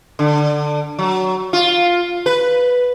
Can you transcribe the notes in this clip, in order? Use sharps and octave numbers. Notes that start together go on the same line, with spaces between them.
D3
F#3
F4
B4